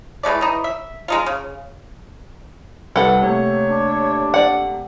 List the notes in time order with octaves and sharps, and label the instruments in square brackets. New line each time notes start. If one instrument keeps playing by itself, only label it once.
[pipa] E3 G#3 A3 D5
E3 D#4
E5
G#3 D#4 F4
C#3
[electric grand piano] C2 G3 B4 [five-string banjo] A4 F#5
[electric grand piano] C3 A3 A#3 [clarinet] C#5
[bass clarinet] D4
[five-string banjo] D5 F#5